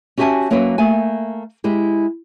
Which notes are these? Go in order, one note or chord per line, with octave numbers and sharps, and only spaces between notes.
C#4 F#4 G4 E5 G#5 A5
F#3 A#3 C#4 F#4 B4 E5
A3 A#3 G#5
G#3 E4 G4